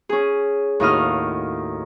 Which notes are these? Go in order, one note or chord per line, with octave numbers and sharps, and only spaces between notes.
C#4 G#4
D#2 A2 D#4 F#4 D#6 F6